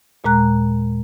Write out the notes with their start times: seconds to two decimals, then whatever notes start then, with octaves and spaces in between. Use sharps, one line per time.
0.24 D#2 A#2 G#3 A#5 F#6